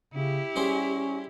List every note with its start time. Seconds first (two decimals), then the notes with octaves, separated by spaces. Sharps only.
0.14 C#3 E4 G4
0.56 G3 C#4 G#4 C5